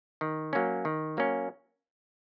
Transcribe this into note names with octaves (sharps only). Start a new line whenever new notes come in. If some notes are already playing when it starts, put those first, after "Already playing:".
D#3
F#3 A#3 C#4
D#3
F#3 A#3 C#4